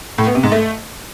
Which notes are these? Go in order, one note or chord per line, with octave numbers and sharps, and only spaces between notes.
A2
B3
C3
G#2
A3